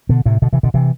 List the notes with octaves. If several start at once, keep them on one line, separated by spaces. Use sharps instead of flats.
B2 D3
A2 C3
B2 D3
C3 E3
B2 D3
C3 E3